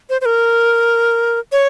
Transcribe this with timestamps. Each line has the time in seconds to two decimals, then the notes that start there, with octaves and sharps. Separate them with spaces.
0.10 C5
0.21 C5
0.25 A#4
1.52 C#5